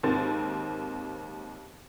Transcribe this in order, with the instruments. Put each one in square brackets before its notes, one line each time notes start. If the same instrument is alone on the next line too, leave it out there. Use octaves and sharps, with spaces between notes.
[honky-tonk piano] D#2 G#2 A#3 C4 A6